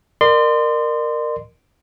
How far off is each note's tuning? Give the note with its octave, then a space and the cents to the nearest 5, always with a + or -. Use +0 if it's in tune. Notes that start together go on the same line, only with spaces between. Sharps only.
A#4 +0 D5 +40 C6 -15